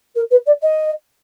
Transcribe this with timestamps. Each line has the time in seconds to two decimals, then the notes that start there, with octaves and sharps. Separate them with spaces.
0.15 A#4
0.31 B4
0.46 D5
0.62 D#5